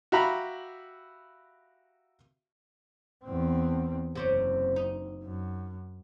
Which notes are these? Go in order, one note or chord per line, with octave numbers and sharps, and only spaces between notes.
F#4 G4 E5 F5 A#5 B5
E2 C4
F#1 C3 C4 C#4
D#4
F#2